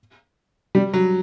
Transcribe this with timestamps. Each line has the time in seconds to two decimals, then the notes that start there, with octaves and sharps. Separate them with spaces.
0.75 G3
0.93 F#3